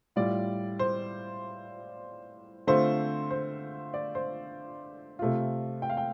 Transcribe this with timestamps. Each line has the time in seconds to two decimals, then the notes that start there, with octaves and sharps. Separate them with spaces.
0.16 A2 G3 F4 D5
0.79 C5
2.67 D3 A3 C4 F4 C5
3.31 C5
3.94 D5
4.15 C5
5.19 C3 A3 F4
5.82 G5
5.89 F5
5.97 G5